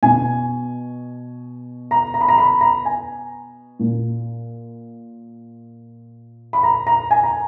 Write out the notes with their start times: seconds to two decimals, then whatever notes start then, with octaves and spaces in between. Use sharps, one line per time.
0.03 B2 G#5
1.91 A#5
2.14 A#5
2.21 B5
2.28 A#5
2.38 B5
2.61 A#5
2.85 G#5
3.79 A#2
6.53 B5
6.63 A#5
6.87 A#5
7.11 G#5
7.23 A#5